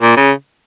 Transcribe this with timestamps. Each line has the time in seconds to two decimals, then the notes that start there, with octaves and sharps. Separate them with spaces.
0.02 A#2
0.17 C#3